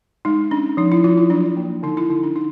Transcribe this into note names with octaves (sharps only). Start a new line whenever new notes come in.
G#3 D#4
C#4 D4
F3 D#4
E4
F3 F4
E4
F#3 D4
A#3
D3 D#4
E4
D3 D#4
D4
D#4